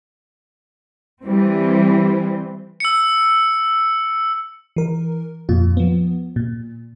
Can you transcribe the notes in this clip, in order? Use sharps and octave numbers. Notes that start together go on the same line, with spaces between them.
E3 G3 C4
E6 C#7
E3 A#4
F2 A#2 F4
F3 B3
A#2